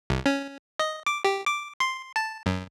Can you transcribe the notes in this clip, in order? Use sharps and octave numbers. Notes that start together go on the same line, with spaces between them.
C2
C#4
D#5
D6
G4
D6
C6
A5
F#2